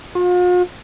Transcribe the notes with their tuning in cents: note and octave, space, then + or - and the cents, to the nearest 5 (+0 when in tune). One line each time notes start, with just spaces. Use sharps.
F4 +45